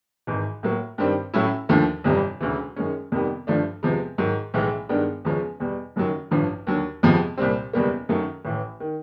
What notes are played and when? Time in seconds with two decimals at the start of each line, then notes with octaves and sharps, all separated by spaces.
0.27 G#1 G#2 E3
0.63 A2 F#3 A#3
0.98 G2 D#3 G3 C4
1.34 A2 F#3 A3 C#4 E4
1.69 D#2 D3 F3 A3
2.04 G1 F2 C3 E3 G3
2.41 E1 D2 C#3 E3
2.76 F#2 D#3 G#3 C#4
3.12 F2 C3 D#3 G3 B3
3.47 G2 D3 F3 A3 D4
3.83 E2 C3 F3 G#3
4.18 G#2 D#3 F#3
4.54 B1 A2 E3 G#3
4.89 G2 D#3 G#3 B3 D4
5.25 E2 C#3 F3 G#3 C#4
5.60 E2 B2 G3
5.96 F#1 F#2 D#3 F#3
6.31 A1 G2 D3 F3
6.67 D#2 D3 F#3
7.03 F2 C3 F3 G#3 B3
7.38 C2 A#2 G3 C4
7.73 F#1 E2 B2 G3 A#3
8.09 F#2 D#3 F#3 A3
8.45 A1 A2 E3
8.80 D#3